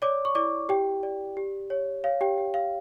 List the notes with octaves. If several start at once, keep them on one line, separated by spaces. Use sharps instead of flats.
C#5 D5 D6
C#6
E4 D5 D6
G4 G5
D5
G4
C#5
C#5 F5
G4 G5
G4
F5